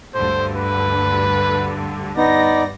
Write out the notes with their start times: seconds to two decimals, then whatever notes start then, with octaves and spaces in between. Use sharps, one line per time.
0.15 D2 G2 D3 C5
0.56 B4
2.17 G2 B3 D#4 D5 A#6